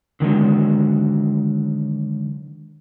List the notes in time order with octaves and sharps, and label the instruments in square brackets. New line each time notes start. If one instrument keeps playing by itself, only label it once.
[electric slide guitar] D3 D#3 F#3 G#3